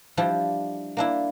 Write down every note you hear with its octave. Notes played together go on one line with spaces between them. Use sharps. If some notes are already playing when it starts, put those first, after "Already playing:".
F3 G3 D4 E4
A#3 D4 E4